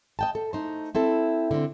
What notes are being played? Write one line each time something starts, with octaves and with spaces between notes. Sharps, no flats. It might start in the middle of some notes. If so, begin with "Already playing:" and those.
D#5 G5 A5
A4
A3 D#4 C5
C4 E4 A4
D3 C4